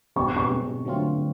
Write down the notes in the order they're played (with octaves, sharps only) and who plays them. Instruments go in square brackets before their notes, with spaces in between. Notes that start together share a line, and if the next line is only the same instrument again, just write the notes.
[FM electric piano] B2 G#3 C4 [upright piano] C#6
[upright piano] C#6
[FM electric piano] B2 G#3 C4
D3 F#3 A3 C4 F4